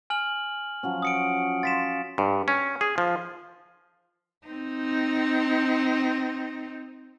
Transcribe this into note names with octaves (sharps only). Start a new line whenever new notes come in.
G#5 F6 F#7
F3 F#3 C#4
D#6 C#7 D7
F4 A6 B6 E7
G2
C#4
G#4
F3
C4 D#4